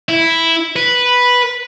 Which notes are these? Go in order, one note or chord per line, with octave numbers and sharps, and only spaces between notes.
E4
B4